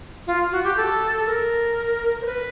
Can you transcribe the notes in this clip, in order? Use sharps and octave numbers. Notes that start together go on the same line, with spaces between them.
F4
F#4
G4
A4
A#4
C5
B4